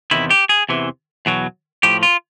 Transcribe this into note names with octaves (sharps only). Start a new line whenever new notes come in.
E2 C3 D#3 E4
G4
G#4
E2 C3 E3
E2 B2 F#3
A2 F3 G4
F4